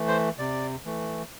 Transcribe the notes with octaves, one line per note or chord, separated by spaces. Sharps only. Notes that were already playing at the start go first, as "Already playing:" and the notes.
Already playing: E3 A3
C5
C3 D5
E3 A3